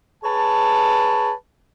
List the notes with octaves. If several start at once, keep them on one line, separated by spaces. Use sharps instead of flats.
G#4 B4 C#5 A5